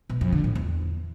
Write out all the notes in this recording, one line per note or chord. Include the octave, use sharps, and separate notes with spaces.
B2
F2
D3
A2
E2